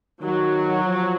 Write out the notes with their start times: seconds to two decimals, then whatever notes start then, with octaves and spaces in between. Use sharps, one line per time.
0.22 D#3 F#3
0.84 F3